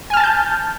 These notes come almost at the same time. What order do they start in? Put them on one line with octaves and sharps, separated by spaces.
G#5 F6 A5 A6 G6